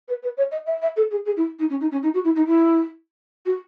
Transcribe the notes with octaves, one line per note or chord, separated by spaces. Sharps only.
B4
B4
C#5
D#5
E5
E5
A4
G#4
G#4
E4
D#4
C#4
D#4
C#4
D#4
F#4
E4
D#4
E4
F#4